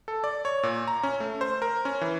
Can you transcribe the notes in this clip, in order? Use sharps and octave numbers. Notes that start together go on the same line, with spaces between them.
A4
D5
C#5
A#2
A#5
C#4
A3
C5
A#4
C#4
E3